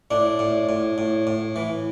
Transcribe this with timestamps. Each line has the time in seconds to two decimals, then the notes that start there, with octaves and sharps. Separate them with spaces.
0.11 A2 D4
0.39 A2
0.69 A2
0.98 A2
1.27 A2
1.56 E3